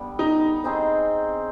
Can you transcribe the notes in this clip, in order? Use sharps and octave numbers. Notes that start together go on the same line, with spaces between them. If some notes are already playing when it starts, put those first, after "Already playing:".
Already playing: D3 G3 B3
D#4
C4 D#4 G#4 C5